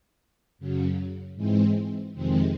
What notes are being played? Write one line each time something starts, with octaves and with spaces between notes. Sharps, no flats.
F#2 C#3 F#3
G#2 E3 G#3 C4
F2 C3 D#3 G#3 C4